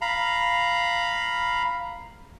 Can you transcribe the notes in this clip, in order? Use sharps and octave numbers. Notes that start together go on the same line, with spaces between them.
F5 A#5 B5